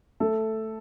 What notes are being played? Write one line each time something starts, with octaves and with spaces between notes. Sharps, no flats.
A3 A4